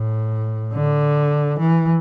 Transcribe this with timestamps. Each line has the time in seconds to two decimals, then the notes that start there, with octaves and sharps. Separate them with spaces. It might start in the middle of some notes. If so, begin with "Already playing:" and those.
Already playing: A2
0.73 D3
1.59 E3